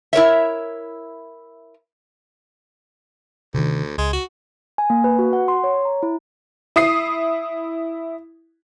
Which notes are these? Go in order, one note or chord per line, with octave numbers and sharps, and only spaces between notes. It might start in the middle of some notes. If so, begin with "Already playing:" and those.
E4 A#4 C#5 E5
D2 C3 D#3
C#2 G#3
F#4
G#5
A#3
B4
F#4
F#5
C6
C#5
A#5
E4
E4 D#6 C7